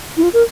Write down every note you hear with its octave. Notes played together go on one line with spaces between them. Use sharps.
E4
F4
A#4